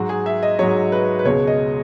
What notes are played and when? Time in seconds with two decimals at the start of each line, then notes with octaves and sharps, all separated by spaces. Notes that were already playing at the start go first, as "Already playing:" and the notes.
Already playing: G#2 F#3 F#4
0.09 G#4
0.26 E5
0.43 D#5
0.59 G#2 F#3 C#5
0.92 B4
1.19 B4
1.25 C#2 B2 G#3 C#5
1.47 D#5